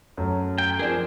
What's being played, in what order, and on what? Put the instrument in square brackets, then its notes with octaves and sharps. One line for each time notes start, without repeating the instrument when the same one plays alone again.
[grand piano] F#2 A3
[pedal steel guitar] G5
[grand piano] F3 D4 A#4 [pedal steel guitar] C4 G#4